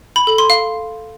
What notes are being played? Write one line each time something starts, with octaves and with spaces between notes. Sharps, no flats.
B5
A4
C6
F5